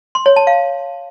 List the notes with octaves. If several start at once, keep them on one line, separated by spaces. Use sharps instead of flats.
C6
C#5
A5
F5